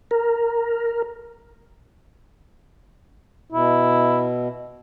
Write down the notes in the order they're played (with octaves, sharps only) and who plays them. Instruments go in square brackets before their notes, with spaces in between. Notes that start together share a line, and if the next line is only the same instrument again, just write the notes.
[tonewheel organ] A#4
[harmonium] B2 [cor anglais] E4